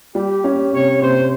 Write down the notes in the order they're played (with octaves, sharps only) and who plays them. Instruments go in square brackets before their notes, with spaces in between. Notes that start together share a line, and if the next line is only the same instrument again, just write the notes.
[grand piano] G3 [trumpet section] G4
[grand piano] C#4
[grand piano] C3 [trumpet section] C#5
[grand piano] C3 [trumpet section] C5